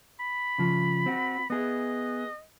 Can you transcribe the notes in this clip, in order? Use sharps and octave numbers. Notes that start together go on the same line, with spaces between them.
B5
C#3 F3
C4 F#4
B3 G#4 D#5